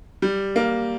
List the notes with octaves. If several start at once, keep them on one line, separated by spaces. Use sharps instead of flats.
G3
A#3